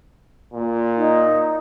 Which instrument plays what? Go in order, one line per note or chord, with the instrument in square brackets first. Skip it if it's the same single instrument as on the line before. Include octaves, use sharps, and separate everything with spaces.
[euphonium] A#2
[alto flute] D#4